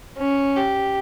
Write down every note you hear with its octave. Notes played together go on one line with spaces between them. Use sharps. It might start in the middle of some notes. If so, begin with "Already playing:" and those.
C#4
G4